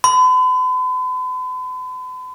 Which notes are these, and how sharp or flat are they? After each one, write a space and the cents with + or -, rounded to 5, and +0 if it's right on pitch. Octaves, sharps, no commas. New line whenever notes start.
B5 +45